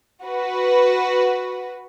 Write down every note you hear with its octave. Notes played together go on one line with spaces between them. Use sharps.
F#4 B4